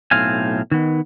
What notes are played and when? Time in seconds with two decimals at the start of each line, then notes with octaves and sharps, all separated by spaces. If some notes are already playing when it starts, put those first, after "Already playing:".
0.11 B1 A2 C4 F5 G#5
0.72 D#3 B3